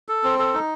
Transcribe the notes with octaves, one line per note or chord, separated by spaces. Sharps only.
A4
C4
A4
D#4